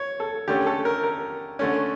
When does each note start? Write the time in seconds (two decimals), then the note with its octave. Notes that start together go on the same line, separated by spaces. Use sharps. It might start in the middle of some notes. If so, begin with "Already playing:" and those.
Already playing: C#5
0.20 A4
0.48 D3 A3 C#4 G4
0.66 A4
0.85 A#4
1.03 A#4
1.59 D3 A3 C#4